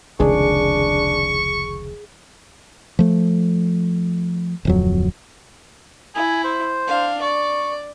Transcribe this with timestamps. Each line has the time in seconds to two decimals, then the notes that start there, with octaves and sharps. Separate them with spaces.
0.20 F1 C#2 D#3 D4 G#4 C#6
2.99 F3 A3
4.65 D1 F2 F#3
6.15 E4 G#5
6.44 C5
6.87 D4 F5
7.22 D5 C#6